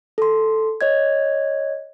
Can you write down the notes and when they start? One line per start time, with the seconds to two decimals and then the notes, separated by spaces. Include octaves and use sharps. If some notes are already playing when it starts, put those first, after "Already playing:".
0.18 A4 C6
0.81 C#5 D#5 G#6